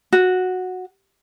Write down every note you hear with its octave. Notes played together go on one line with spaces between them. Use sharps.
F#4